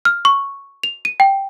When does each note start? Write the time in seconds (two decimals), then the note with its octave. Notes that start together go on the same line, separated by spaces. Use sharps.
0.05 F6
0.25 C#6
0.83 F7
1.05 D#7
1.20 G5